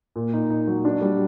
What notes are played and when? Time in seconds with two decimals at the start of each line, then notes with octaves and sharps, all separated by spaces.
0.16 A#2
0.33 D#4
0.50 D#4
0.68 F#3
0.85 D4
1.01 G3